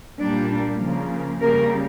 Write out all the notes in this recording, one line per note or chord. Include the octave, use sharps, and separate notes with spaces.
A#2 G3 A#3 D4
C#3 F3 A#3
C#3 G3 A#3 A#4